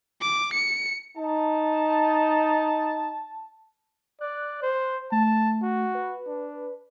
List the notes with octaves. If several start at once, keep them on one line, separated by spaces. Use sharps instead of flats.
D6
C#7
D#4 A5
D5 F#6
C5
A3 A5
F#4
B4
D4